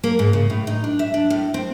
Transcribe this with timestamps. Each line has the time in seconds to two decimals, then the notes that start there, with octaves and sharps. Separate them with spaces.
0.04 A#3
0.19 G#2
0.33 C#3
0.50 A2
0.67 D#4
0.84 D4
0.99 E5
1.14 D4
1.30 A2
1.54 C4